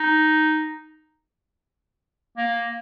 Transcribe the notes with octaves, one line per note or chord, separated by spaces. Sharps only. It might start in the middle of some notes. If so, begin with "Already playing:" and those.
Already playing: D#4
A#3